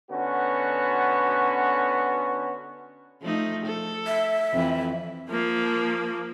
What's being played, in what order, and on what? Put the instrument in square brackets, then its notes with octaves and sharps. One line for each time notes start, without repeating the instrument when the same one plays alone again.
[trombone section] D3 B3 C#4 F#4
[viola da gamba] F3 A3 D#4
A4
[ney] E5
[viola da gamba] F2 E3
[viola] F3 A#3